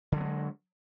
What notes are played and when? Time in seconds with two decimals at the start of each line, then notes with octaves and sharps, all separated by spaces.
0.12 D3
0.16 F#3
0.21 B3
0.25 G#3